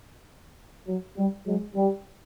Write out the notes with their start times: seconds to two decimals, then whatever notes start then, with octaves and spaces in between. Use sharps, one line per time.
0.87 F#3
1.16 G3
1.46 F#3 G#3
1.74 G3